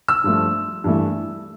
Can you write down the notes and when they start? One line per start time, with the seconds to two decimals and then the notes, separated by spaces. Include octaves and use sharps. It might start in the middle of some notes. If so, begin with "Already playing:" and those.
0.08 E6
0.24 G2 F3 A3
0.84 G2 E3 A3